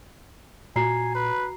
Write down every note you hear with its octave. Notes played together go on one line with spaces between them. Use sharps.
A#2 F#4 G#5 A#5 C7
B4